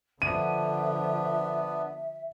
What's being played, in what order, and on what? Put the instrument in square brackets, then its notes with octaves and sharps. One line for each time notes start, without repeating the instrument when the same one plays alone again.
[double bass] D3 F3 [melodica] B3 D4 [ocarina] E5 [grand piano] D#7